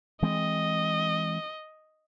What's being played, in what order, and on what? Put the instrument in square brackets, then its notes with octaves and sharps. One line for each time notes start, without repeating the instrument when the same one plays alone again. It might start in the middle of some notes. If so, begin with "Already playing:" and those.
[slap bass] E3 G#3 C4 [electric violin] D#5